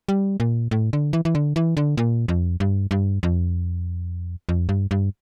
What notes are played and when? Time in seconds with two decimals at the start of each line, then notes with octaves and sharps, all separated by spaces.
0.09 G3
0.40 A#2
0.71 A2
0.93 D3
1.13 E3
1.25 E3
1.35 D3
1.56 E3
1.77 D3
1.97 A#2
2.28 F2
2.60 G2
2.91 G2
3.23 F2
4.49 F2
4.69 G2
4.91 G2